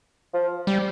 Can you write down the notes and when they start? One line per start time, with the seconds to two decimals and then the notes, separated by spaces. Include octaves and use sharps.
0.34 F3
0.67 G3